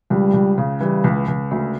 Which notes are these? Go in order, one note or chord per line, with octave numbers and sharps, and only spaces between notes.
C#2 G3
C#2
C#3
E3 G3
C#2
C#2
D2